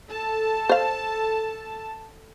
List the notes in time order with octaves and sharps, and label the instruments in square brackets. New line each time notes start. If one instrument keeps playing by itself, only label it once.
[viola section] A4 A5
[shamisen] C5 F5